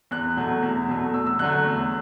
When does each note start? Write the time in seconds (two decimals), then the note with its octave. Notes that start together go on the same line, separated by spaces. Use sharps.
0.11 E2 F#6
0.37 B2 F#3 A3
0.62 E2
0.88 B2 F#3 A3
1.13 E2 E6
1.27 E6
1.39 D3 F#3 A3 F#6
1.53 F#6
1.65 E2